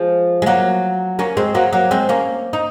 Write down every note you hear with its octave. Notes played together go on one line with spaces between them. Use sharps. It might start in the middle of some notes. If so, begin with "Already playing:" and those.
Already playing: F3 G#3
G#3
F#3 A#3
A#3 C#4
G#3 C4
F#3 A#3
F#3 A#3
G#3 C4
A#3 C#4
D#4